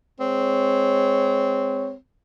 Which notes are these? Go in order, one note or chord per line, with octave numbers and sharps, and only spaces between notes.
G#3 C4 C#5